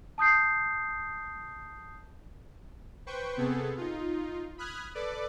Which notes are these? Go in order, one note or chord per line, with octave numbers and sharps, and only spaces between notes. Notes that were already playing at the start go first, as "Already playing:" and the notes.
A5 D#6 G6 C7
B4 C5 G5 C#6
C3 B3 G#4 A4
D#4 F4
B5 D#6 F6 F#6 G#6
A4 B4 D5 D6